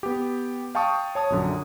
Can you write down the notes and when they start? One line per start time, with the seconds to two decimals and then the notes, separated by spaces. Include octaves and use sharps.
0.03 B3 G4
0.75 F5 G5 A5 C#6 D#6
1.15 C#5 A5 D#6
1.30 A#1 F#2 D3